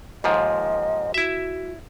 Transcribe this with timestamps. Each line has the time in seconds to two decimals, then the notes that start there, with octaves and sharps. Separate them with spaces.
0.24 D#2 G#2 F3 D#5
1.14 E4 F#4 E5